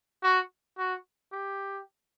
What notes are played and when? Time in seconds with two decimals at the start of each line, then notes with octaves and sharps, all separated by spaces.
0.23 F#4
0.78 F#4
1.32 G4